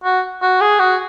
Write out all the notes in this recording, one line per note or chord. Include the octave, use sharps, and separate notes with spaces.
F#4
F#4
G#4
F#4